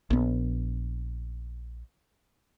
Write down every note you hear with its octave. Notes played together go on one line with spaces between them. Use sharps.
A#1 B3